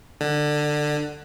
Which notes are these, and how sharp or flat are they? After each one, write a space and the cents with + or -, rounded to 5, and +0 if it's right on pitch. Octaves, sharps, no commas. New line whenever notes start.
D3 +20